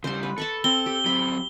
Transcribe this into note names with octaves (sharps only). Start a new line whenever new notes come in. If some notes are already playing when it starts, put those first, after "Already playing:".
C#3 G3 C5 C6
B4
A4 A5 B5 C#6
C4 G7
G4
F#3 C4 B5